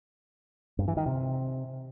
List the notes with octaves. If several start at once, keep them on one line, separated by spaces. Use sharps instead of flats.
G2
E3
D#3
C3